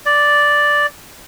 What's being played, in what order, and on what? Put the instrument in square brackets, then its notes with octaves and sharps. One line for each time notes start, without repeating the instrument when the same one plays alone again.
[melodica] D5